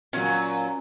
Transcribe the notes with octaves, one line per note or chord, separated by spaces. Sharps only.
A#2 F#3 C#4